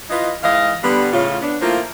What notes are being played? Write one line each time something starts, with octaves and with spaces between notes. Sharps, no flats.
E3 F4 B4 D#5
G#2 E3 D#5 F5
D3 G3 B3
A2 C#3 F4
B3 D4
F3 A3 A#3 C4 E4 F4